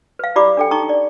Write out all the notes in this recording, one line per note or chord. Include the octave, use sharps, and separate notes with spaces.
B4 F5
E4 G4 D5 B5 D6 D#6
D4 A4 G5
D#4 G5 A#5 C#6 D#6
D5